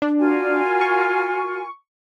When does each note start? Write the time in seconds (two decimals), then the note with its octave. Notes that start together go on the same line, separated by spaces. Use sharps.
0.02 D4
0.20 F4 F#4 A#4 G#5
0.81 C#6